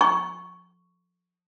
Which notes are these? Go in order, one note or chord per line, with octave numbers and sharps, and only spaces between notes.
C#6